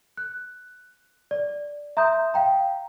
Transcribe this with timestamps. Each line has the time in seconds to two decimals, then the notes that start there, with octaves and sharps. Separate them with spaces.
0.17 F#6
1.31 D5
1.97 E5 A#5 C6 D#6 G6
2.34 F5 G5 A#5